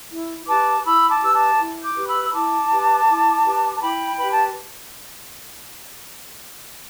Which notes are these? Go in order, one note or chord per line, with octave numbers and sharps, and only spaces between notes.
E4
G4 B4 A5 D6
E4 B5 E6
A5 D6
G4 B4 E6
A5 D6
E4
D6 G6
G4 B4
B5 E6
E6
E4 A5 D6
G4 B4
E4
G4 B4
A5
E4 G5 B5
G4 B4 B5
A5